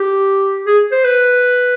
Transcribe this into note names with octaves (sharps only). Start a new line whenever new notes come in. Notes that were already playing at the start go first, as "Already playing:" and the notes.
Already playing: G4
G#4
C5
B4